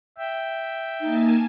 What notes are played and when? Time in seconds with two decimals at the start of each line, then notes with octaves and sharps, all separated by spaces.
0.18 E5 G5
1.01 A#3 D#4 G#5 A5